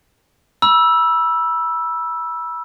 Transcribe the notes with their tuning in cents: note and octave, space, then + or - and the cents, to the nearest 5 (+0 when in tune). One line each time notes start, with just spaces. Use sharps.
B5 -30 E6 +5